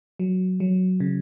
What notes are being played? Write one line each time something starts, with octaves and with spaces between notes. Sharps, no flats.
F#3
F#3
C#3